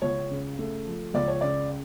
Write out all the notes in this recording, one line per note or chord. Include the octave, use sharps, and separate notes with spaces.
C#2 C#5
C#3
A3
F3
C#2 D5
C#5
C#3 D5